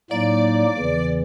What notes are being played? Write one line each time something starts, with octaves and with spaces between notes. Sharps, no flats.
A2 F#3 A#3 D#4 D5
E2 C#3 E3